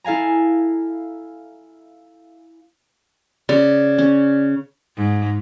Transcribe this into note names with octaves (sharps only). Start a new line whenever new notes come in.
E4 A4 F5 G#5 A#5
C#3 D5
C#4
G#2